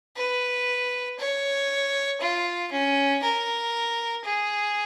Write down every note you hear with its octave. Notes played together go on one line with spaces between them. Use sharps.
B4
C#5
F4
C#4
A#4
G#4